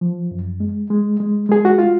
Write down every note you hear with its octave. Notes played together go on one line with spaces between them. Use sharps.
F3
F#2
G#3
G#3
G#3
G#3 G#4
F#4
F4